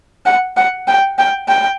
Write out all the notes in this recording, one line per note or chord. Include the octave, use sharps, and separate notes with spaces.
F#5
F#5
G5
G5
G5